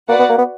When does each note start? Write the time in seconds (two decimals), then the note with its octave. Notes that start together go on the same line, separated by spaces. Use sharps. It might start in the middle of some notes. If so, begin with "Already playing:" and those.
0.09 A#3 F#4 B4 D5 F#5
0.19 B3
0.29 A#3
0.38 B3